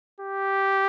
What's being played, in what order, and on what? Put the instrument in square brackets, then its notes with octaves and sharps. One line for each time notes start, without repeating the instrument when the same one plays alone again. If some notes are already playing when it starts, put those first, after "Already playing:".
[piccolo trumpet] G4